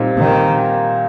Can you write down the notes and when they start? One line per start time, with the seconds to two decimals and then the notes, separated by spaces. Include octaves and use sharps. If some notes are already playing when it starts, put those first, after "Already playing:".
Already playing: A#2 G3 C4 D#4 G4
0.19 D#3